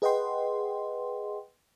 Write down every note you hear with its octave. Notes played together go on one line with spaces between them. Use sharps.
G#4 B4 D#5 F#5 G5 C6